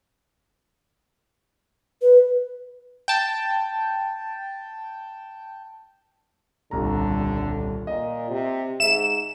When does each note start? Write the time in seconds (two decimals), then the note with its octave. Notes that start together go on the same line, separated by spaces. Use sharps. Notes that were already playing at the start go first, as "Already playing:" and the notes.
2.02 B4
3.08 G5 A5
6.71 D#1 C2 D3 A#5
7.87 A#2 D#5
8.30 C3
8.80 G#2 E5 E7